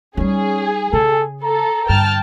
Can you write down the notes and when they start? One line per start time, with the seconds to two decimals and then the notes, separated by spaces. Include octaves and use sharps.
0.17 G3 C#4 D#4 G#4
0.93 C#3 A4
1.43 A4 A#5
1.89 G2 D3 G5 A5 F6